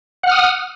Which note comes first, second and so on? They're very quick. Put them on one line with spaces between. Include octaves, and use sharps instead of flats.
F#5 F6 D#6